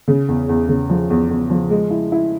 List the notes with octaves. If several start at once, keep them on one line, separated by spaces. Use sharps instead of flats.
C#3
E2
E2
C#3
F3
E2
E2
F3
G#3
E4
E4